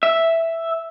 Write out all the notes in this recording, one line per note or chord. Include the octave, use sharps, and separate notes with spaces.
E5